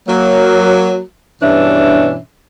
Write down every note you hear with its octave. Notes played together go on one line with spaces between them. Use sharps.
F#3 A#3
G2 B2 E3 C#4 D4 E5